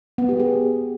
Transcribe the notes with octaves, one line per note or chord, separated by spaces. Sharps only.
B3
G4
G#4